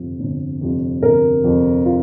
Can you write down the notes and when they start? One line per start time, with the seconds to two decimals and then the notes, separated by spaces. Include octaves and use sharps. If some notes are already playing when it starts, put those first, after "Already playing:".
Already playing: G1 F2 C3 F3
0.20 G1
0.61 F2 C3 F3
1.02 G1 A#4
1.43 F2 C3 F3
1.85 F4